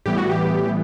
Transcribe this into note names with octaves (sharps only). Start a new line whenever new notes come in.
A2 E3 G3 B3 G4
F#4
G4